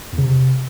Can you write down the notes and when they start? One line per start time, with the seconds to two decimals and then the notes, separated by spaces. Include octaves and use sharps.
0.13 E2
0.18 C#3
0.23 C3